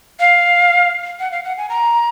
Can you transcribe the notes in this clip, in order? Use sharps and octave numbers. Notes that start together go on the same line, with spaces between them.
F5
F#5
F5
F#5
G#5
A#5